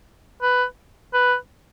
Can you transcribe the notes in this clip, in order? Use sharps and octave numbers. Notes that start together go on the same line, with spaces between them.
B4
B4